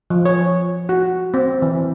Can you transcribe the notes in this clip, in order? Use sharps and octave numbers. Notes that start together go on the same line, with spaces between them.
F3
C#5
F#4
C4
E3